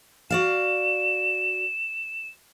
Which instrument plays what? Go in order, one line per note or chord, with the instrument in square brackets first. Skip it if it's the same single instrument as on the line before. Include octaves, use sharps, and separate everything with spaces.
[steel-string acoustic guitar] F#4 D5 F5 [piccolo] E7